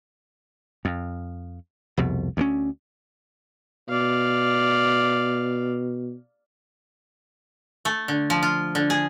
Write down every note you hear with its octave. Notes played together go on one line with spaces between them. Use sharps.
F2
C2 F2 B2
D2 F3 C#4
B2 D5 F5
A3
D3
F3
F4
D3
G#4